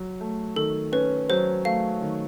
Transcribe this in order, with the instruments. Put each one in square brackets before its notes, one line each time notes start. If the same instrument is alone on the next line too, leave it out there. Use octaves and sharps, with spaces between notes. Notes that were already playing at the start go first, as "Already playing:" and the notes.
Already playing: [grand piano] F#3
A3
[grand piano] D#3 [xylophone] A4
[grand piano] C#4 [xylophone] B4
[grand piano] F#3 [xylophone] C5
[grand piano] A3 [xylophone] F5
[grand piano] D#3